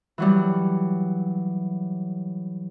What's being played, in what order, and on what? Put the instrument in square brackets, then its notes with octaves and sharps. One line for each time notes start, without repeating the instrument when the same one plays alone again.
[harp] E3 F#3 G3